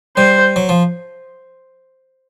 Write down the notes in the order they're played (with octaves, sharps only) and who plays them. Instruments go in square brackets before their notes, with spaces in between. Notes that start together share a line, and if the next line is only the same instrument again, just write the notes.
[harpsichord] G3 [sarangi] C5
[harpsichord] F#3
F3